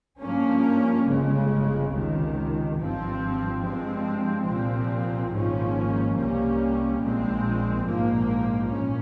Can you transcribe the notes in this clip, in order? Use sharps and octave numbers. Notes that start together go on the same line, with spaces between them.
G2 F3 A#3 C#4
G1 F2 C#3 G#3
C#2 C3 D#3
G#1 G2 F3 C4
G2 F3 G#3 C4
C2 A#2 F3 C4
G#1 G#2 F3 A#3 C#4
C2 C3 G3 A#3 C#4
A#1 A#2 G#3 C4
A#1 G#2 F3 A#3
A#1 C#4